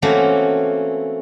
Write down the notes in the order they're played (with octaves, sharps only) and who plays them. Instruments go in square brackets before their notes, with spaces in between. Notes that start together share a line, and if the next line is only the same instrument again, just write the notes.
[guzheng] E3 A3 A#3 C4 C#4 F#4